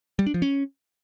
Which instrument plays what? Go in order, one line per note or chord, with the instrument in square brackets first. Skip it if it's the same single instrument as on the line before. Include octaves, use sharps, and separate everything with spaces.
[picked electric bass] G3
D4
F3
C#4